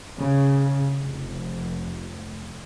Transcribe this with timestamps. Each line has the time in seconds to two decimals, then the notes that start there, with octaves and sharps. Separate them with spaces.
0.18 C#3
1.03 F1